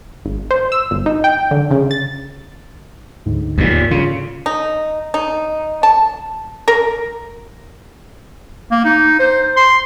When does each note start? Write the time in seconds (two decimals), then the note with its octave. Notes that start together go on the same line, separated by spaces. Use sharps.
0.25 G#1
0.51 C5
0.72 E6
0.91 G1
1.06 D#4
1.24 G5
1.51 D3
1.71 C#3
1.91 A6
3.26 D2 G#2 D3
3.58 D#2 A#2
3.91 C#3 F4
4.46 D#4
5.14 D#4
5.83 A5
6.68 A#4
8.71 A#3
8.85 D#4
9.19 C5
9.57 C6